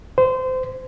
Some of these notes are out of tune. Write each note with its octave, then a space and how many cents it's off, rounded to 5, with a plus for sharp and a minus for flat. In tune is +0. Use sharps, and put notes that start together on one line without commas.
C5 -25